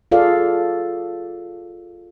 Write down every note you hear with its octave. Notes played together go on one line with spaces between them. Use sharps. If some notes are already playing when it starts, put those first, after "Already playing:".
F4 G#4 A4 D5 F5